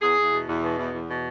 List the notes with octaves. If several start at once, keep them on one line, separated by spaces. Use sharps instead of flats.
E2 G#4
E2
B2
E2
B2
E2
E2
B2